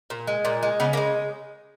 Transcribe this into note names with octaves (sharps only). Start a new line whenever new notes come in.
A#2
G#3
A#2
G#3
C#3 B3
A#3
G#3